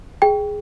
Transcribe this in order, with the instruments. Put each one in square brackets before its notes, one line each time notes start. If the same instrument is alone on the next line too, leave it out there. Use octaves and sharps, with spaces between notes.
[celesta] G#4 [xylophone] G5